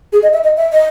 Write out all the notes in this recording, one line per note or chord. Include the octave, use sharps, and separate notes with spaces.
G#4
D#5
E5
D#5
E5
D#5